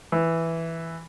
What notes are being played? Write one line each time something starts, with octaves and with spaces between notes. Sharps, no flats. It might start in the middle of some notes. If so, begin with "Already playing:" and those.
E3